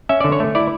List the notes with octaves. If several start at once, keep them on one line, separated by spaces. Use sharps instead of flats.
C#4 E5
D3 D5
C#5
A3
E4 D5